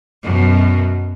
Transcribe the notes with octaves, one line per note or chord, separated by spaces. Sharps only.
F#2 B2